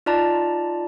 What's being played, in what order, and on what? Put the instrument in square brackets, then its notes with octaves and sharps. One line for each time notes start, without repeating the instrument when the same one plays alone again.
[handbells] D#4 F4 D5 A5 A#5